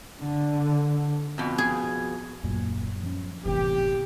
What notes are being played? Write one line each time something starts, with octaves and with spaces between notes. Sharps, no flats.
D3
F2 B2
G#4
D#1 F#2 A#2 A#3
F3 C#4
G1 E2 A2 C3 E3 G4